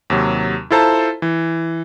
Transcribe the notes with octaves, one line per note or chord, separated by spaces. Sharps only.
D#2 C3 F#3
E4 F4 A4 C5 A5 A#5
E3